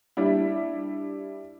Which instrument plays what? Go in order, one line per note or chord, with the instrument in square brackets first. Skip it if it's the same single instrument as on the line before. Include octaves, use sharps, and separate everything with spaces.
[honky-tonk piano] G3 D4 E4